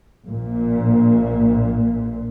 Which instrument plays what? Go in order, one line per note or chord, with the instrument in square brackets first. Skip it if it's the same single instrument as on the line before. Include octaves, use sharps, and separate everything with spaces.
[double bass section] A#1 A#2